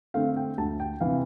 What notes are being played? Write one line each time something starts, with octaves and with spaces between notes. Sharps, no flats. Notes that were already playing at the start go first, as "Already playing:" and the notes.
D3 A3 C4 F5
G5
D2 A5
G5
C3 E3 F5